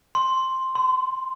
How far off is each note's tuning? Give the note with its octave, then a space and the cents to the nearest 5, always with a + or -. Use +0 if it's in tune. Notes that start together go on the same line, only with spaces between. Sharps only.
C6 +5
C6 -30